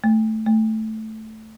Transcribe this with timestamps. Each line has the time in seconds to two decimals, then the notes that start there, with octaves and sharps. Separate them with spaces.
0.04 A3
0.46 A3